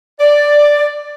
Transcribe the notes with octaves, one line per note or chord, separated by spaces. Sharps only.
D5